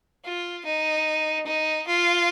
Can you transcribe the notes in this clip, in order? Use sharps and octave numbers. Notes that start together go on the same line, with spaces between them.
F4
D#4
D#4
F4